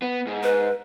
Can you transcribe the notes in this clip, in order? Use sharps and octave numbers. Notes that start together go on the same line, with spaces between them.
B3
G#2
B4